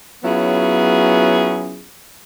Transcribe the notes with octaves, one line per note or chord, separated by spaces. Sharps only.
F#3 B3 C#4 E4 F4 G#4